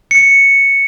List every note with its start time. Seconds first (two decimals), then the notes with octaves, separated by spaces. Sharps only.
0.11 C#7